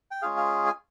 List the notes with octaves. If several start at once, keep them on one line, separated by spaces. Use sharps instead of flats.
G5
G#3 C#4 F4 G#4 F5
F5
G#5